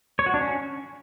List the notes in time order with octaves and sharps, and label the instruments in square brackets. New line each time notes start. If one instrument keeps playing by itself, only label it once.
[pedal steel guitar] C#5
F#4
D4
C#4